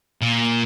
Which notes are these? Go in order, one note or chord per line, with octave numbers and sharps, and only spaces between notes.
A#2